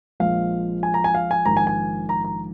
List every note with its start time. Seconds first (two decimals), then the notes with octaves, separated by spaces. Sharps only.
0.20 A#1 A#2 F3 G#3 F5
0.83 G#5
0.94 A#5
1.04 G#5
1.15 F5
1.31 G#5
1.45 A#1 G#2 D#3 A#5
1.57 G#5
1.67 G#5
2.09 A#5
2.24 A#5